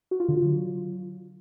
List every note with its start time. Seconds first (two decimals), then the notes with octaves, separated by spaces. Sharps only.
0.11 F#4
0.20 F4
0.28 D3
0.37 F4
0.46 F#3